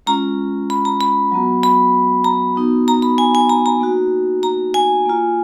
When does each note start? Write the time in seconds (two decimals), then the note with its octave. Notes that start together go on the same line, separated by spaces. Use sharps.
0.07 G#3 C#4 F4 A#5
0.70 B5
0.85 A#5
1.01 B5
1.31 F#3 B3 F#4
1.63 B5
2.24 A#5
2.56 B3 D#4 F#4
2.88 A#5
3.02 B5
3.18 G#5
3.35 G#5
3.49 A#5
3.66 A#5
3.80 A#3 D#4 F#4
4.43 A#5
4.74 G#5
5.06 A#3 F4